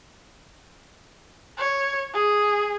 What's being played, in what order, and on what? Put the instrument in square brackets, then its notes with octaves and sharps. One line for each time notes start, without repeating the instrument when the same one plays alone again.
[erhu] C#5
G#4